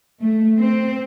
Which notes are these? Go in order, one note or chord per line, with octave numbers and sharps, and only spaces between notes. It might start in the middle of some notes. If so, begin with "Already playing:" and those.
A3
C4